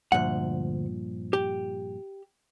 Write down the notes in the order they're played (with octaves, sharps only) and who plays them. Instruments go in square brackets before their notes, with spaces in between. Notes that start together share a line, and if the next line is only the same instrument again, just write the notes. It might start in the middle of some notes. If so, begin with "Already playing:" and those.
[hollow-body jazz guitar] D2 F#5 [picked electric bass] G2 A#2 F3
[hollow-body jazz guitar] G4